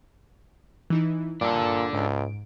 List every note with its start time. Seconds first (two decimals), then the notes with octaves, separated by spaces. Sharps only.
0.90 E3 D#4 E4
1.41 G2 A#2 D4 A4
1.93 C#2 G#2 D7